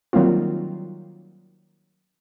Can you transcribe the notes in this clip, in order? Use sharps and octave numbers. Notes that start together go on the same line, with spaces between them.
D#3 F#3 G3 A#3 C4 F4